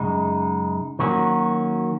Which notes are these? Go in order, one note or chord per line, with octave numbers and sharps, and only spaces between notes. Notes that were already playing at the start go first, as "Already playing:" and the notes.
Already playing: F#2 C#3 G#3 D#4
D#3 F#3 A#3 C#4 F#4